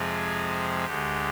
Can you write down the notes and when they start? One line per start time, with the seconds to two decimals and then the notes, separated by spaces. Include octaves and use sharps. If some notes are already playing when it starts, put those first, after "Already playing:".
Already playing: F2 C3 F3 G#3 C4 G#4
0.85 D2 D3 G#3 G4